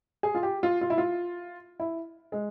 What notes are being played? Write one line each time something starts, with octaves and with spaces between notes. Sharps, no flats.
G#4
F4
G4
F4
F4
E4
F4
E4
G#3